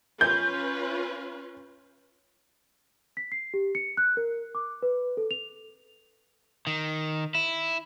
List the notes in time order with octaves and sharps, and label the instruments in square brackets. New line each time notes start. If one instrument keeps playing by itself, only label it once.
[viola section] C#4 F4 B4 [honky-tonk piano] G6
[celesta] B6
C7
G4
C#7
F#6
A#4
D6
B4
A4
F7
[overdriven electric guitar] D#3
E4